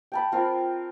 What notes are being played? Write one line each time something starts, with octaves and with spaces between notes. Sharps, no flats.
G5 A5 B5
C4 F4 A#4